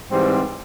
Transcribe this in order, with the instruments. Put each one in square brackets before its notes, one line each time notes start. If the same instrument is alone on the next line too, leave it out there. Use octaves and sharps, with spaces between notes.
[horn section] G#2 E3 G3 C4